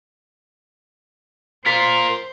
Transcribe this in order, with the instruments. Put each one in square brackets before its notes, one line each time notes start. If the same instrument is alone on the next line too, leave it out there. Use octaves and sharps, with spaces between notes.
[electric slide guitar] F4 A#4 [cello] C5 [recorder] C6 [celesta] B6